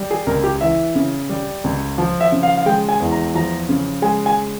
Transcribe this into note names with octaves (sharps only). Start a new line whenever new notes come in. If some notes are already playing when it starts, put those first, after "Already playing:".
Already playing: G3
G#4
C#2 A#4
G4
E3 E5
C#3
G3
C#2
F3
E5
C#3
F5
F5
G#3 G5
G#5
E2
A#5
F3 A#5
C#3
G#3 G#5
G#5